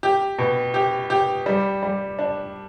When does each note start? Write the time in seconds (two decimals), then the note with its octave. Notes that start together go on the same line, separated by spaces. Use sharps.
0.03 G4
0.38 B2
0.74 G4
1.10 G4
1.46 G3
1.83 G3
2.19 D4